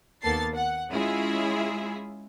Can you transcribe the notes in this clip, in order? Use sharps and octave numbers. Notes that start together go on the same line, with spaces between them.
D#2 A#3 B3 A4 A6 C7
F#5
G#3 C#4 E4 F4 G#4 E5